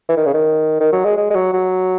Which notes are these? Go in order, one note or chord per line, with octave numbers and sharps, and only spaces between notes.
E3
D#3
C#3
D#3
D#3
F#3
G#3
G#3
G#3
F#3
F#3